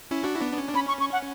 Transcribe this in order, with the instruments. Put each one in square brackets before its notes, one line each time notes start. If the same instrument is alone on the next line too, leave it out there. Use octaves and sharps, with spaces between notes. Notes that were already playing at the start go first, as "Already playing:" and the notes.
[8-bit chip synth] C#4 E4
D4 F#4
E4
B3 D4
D4
C#4
D4
[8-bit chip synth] C#4 [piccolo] B5
[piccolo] C#6
C#6
F#5